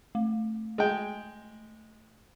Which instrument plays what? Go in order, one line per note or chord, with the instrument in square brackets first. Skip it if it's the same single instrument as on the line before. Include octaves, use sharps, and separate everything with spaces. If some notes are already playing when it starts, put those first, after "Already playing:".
[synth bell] A3
[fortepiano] G#3 G5